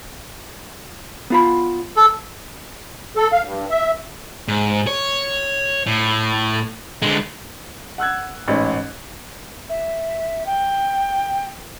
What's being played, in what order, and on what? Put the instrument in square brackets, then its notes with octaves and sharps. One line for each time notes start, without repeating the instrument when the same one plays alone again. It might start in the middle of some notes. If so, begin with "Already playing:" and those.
[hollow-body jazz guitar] B3 F4 B5
[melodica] A4
[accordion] A4
F5
G2
E5
[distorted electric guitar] G#2
C#5
A2
D3 G#3
[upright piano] F#5 E6 F#6 G#6
A1 G#2 B4 C#5
[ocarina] E5
G5